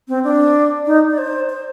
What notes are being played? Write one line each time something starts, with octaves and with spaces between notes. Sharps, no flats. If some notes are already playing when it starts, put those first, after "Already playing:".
C4
D4
D#4
D5
C5
C5